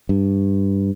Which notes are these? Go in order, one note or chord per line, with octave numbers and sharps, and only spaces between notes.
G2